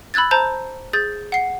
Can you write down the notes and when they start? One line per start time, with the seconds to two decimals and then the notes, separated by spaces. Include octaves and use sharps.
0.14 B5 E6 F#6 G#6 A6
0.31 C5 A5 A#5 G6
0.93 G#4 G6 A6
1.32 F#5 C7